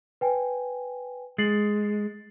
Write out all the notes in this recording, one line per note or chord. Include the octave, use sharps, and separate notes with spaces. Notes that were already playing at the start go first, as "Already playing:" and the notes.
B4 G5 G#5
G#3 A6 C7 F#7